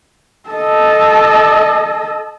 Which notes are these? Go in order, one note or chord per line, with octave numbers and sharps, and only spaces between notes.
A4 D#5